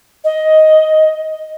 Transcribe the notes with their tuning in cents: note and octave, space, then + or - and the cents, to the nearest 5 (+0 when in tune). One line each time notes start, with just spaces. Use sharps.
D#5 +10